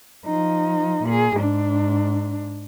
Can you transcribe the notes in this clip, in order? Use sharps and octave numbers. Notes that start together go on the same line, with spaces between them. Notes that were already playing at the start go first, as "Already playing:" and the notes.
F3 D#4
A#2 G#4
G#2 D4